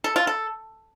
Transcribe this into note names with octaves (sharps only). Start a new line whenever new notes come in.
A4
F4
A4